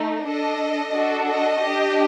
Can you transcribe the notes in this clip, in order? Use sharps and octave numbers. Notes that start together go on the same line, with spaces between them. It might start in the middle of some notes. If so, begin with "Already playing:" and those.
Already playing: A3 D#4
D4 A4 D#5
D4 F#4 A4
D#5
D4 G4